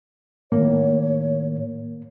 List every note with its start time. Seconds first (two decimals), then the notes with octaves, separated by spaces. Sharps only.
0.52 A2 D#3 A#3 C#5